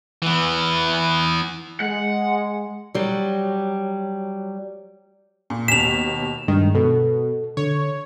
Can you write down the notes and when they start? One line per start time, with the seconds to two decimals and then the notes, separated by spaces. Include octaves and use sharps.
0.22 E3 B3
1.80 G#3 F#5
2.94 F#3 G3
5.50 A#2
5.68 D#2 B2 B6 E7 F7
6.48 G2 D#3 G#3
6.75 B2 A4
7.57 D3 C#5